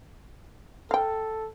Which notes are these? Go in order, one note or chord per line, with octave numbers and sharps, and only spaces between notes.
A4 F5 G5